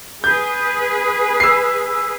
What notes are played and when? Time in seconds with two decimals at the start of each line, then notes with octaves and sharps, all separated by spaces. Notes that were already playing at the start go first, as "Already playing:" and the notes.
0.24 G#4 B4 G6
1.40 E6 C7